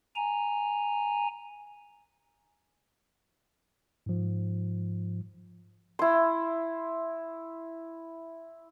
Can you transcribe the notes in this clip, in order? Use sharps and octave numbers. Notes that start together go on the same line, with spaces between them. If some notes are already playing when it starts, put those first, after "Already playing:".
G#5 A#5
G#2 F3
E4 C6